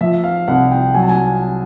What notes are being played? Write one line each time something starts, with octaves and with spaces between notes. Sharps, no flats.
F3 E5
F5
C2 F#5
G5
F#3 G#5
A5
G#5